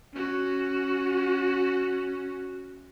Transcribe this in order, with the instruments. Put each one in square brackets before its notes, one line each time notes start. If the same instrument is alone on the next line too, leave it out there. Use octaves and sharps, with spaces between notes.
[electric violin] C#4 F#4